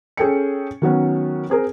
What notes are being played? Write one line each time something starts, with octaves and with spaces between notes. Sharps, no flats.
C#4 G#4 A4 G5 C#7
D#3 F#3 B3 C#4
C4 G#4 A#4